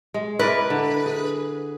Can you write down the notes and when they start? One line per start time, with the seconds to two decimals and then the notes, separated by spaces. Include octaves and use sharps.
0.14 G#3
0.39 E4 A#4 B4 D5
0.70 D3
1.06 G#4